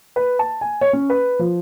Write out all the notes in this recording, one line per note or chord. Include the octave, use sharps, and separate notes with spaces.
B4
A5
G#5
C#5
C#4
B4
F3